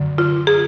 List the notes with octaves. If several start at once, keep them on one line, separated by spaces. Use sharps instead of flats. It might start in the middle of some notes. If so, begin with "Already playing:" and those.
Already playing: F#2 D3 F#3
F4
G#4